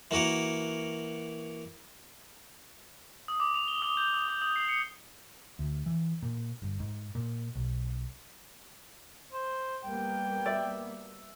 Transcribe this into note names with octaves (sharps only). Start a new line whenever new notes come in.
E3 A#3 F#4 A#4
D#6
D6
F7
G7
D#6
G6
D#6
D6
D#6
C7
C#7
D2
E3
A#2
G1
G#2
A#2
B1
C5
G3 A#3 B3 G5
D5 E5